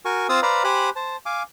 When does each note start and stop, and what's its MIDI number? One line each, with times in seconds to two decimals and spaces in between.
0.05 0.27 66
0.05 0.27 70
0.05 0.27 80
0.05 0.27 85
0.29 0.40 60
0.29 0.40 65
0.29 0.40 72
0.29 0.40 77
0.29 0.40 87
0.29 0.40 88
0.43 0.63 71
0.43 0.63 72
0.43 0.63 74
0.43 0.63 77
0.43 0.63 82
0.43 0.63 83
0.64 0.90 67
0.64 0.90 72
0.64 0.90 80
0.64 0.90 83
0.64 0.90 90
0.96 1.16 72
0.96 1.16 81
1.26 1.43 77
1.26 1.43 80
1.26 1.43 86